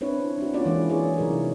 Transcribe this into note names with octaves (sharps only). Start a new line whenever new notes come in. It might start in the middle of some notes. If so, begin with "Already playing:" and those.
C4 D4 E4 B4 C#5
D4 E4 F#4
A#3 C#4 F4 F#4 D5
E3 G#3 E4
G#4 C#5
C3 F#3 D#4 A#4